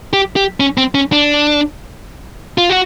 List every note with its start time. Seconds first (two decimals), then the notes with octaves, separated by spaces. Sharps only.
0.13 G4
0.36 G4
0.60 C#4
0.78 C4
0.95 C#4
1.12 D4
2.58 F4
2.70 F#4